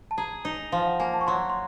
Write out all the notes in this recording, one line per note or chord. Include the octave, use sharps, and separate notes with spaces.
A5
G#4 A#5
D#4
F3 F5
F#5
A#3 G#5
A5
C#6
F#3 C6
C6